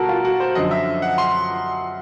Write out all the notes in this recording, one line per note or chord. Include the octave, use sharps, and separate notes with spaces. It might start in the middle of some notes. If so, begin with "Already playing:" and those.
Already playing: B2 G3 F#4 A4 A#4
F4
F#4
C5
F#2 D3 F3 D#5
E5
F#5
C6